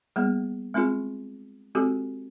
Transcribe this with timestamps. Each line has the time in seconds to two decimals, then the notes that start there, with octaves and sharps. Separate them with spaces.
0.16 G3 A#3 B3 G#4
0.74 G#3 C4 D#4 F4 G#4
1.75 G#3 C4 F#4 G4 A4